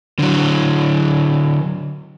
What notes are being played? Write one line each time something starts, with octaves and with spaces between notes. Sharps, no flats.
D3 F#3